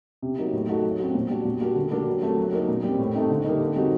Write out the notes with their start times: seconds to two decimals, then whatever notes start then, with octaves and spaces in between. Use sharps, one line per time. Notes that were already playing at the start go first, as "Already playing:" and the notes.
0.22 C3
0.38 F#3 A#3 D#4
0.53 A2
0.69 A3 D#4 F#4
0.84 F#3
1.00 C4 F#4
1.14 A#2
1.30 G3 D4 F#4
1.45 A#2
1.61 G3 A#3 D4 F#4
1.76 D3
1.91 G3 A#3 D4 F#4
2.07 F#3
2.22 A3 C4 F#4
2.38 F#3
2.53 A#3 D#4
2.68 A#2
2.83 G3
2.88 C4
2.98 A2
3.15 A3 C4 D#4
3.30 D3
3.44 G3 A#3 D#4
3.61 D3
3.75 G3 C4 D#4 F#4